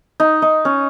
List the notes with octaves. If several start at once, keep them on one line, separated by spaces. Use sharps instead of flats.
D#4
D#4
C#4